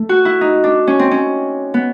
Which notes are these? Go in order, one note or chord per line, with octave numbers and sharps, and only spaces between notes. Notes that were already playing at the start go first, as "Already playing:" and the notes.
Already playing: A3
F#4
E4
D#4
D4
C#4
C4
C#4
B3